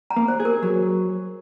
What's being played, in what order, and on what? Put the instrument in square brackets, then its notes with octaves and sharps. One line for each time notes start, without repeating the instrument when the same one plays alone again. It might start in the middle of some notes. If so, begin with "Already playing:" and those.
[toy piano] A#5
[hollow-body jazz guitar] A#3
[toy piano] C5
[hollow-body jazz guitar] G#4
[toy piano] A#4
[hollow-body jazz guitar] F#3